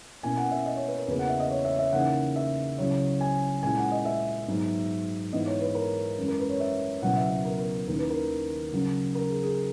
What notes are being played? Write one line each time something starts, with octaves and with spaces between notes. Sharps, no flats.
B2 A#3 C#4 E4 G#5
F#5
E5
D#5
C#5
B4
A#4
E2 C#3 E3 A#3 B4
F#5
E5
D#5
C#5
E5
E5
C#3 E3 A#3 D#4 F#5
E5
C#2 C#3 F#3 C#4 E4 C#5
G#5
A#2 G#3 C#4 E4 G#5
F#5
D#5
E5
G#2 F#3 B3 D#4
G#2 E3 B3 D#4 D#5
C#5
B4
A#4
F#2 E3 G#3 C#4
A#4
B4
C#5
E5
C#2 B2 F#3 B3 E4 F#5
E5
E5
A#4
A#4
D#2 D#3 A#3 C#4 E4 A#4
B4
A#4
C#3 F#3 C#4
A#4
G#4
G#4